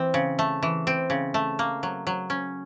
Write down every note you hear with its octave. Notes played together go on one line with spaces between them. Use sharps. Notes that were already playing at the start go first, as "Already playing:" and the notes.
Already playing: E3 C4
C#3
A3
E3
C4
C#3
A3
A#3
F#3
F#3
C#4